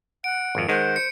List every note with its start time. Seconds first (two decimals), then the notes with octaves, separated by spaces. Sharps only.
0.24 F#5 D7
0.55 G#1 F2
0.69 D#3 G#3 C5 F#5
0.96 C#7